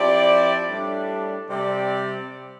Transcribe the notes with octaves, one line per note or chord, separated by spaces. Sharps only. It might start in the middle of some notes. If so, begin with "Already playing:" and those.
Already playing: F3 C4 E4 G4 D5
A2 G3 D4
C3 G3 C4 G4 D5